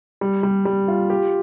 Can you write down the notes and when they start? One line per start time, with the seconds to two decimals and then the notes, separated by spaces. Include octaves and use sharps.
0.21 G3
0.43 G3
0.65 G3
0.88 F4
1.10 G4